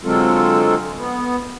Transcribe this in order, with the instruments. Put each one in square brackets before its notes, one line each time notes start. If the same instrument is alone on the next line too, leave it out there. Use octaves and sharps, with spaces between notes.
[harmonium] D3 F#3 G#3 C4 F4 A4
B3